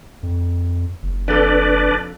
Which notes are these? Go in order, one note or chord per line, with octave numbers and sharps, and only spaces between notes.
F2
F#1
F2 D4 A4 B4 D5